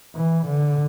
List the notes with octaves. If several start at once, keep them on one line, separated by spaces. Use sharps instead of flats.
E3
D3